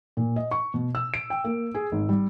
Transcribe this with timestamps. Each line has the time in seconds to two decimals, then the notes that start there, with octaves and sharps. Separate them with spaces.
0.17 A#2
0.36 D#5
0.51 C#6
0.74 B2
0.95 E6
1.14 D7
1.30 G5
1.44 A#3
1.74 G#4
1.92 G#1
2.09 G3